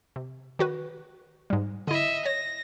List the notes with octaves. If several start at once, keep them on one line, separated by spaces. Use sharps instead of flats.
C3
D#3 F#4 B4
G#2 G3
D3 E4 D#5 E5
C#5 A#6